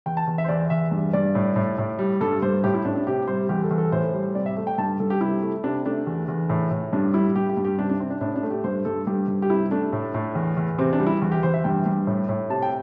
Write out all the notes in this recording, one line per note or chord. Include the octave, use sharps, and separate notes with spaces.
E2 G5
A5
E2
E5
C5
E2 D5
E2 E5
G2
G2 D5
A2
A2
A2
G3
G2 A4
G2 C5
A2 G4
E4
A2 D4
D4
C3 G4
G3 C5
E2 G4
A4
E2
A4
A2 C5
G3
C3 D5
E5
A3
G5
G2 A5
G2 A4
G4
C3 E4
A3
C3 D4
A3 D4
E2
E2
A2
A2
G2 D4
G3 E4
G2 G4
G4
G2
G4
C3 D4
D4
C3 C4
D4
A2 D4
D4
A3
G4
G2 C5
G2 A4
G2 G4
G2
G4
C3 E4
A3 D4
A2
A2
E2
E2
C3 C4
D4
G3
E4
E2
G4
E2 C5
E5
G2 G5
G2
A2
A2
C3 A5
G5